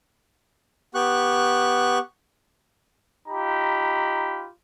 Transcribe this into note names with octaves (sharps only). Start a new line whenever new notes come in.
B3 G4 C#6 F#6
D#4 F4 G4 A#5 B5